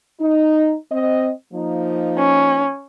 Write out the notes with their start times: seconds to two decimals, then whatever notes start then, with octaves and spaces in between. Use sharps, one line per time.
0.21 D#4
0.92 C4 D#5
1.54 F3 A#3 D#4
2.18 C#4